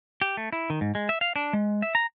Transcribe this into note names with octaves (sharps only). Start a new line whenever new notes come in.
G4
A3
E4
D#3
G#2
G#3
E5
F5
D4
G#3
E5
A#5